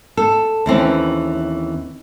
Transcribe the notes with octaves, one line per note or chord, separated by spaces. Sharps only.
A4
D#2 E3 C4 C#4